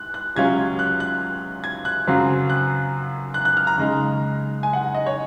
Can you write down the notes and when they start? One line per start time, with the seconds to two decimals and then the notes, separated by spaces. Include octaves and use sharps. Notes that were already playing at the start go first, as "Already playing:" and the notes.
Already playing: F#6
0.14 F#6
0.36 C#2 C3 F#3 C#4 F4 G#6
0.79 F#6
1.00 F#6
1.64 G#6
1.85 F#6
2.07 F#2 C#3 F#3 C4 F4
2.50 F#6
3.34 F#6
3.45 F#6
3.57 F6
3.67 A#5
3.77 C#3 G#3 D#4
4.63 G#5
4.73 F#5
4.95 D#5
5.06 C#5